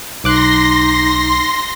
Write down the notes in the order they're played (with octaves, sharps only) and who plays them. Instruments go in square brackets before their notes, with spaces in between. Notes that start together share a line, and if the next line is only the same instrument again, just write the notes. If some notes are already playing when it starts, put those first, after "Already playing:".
[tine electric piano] B1 D6 F#6 [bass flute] D#4 [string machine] C6 A#6